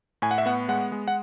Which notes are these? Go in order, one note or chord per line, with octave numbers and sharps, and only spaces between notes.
A2 G#5
F#5
E5
B3 F#5
G#3 F#5
G#3
F#5